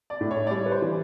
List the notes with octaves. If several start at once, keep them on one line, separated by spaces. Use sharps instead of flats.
D5
A2
C#5
D5
G3 C#5
B4
C5
E3